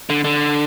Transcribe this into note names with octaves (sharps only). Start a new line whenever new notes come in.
D3
D3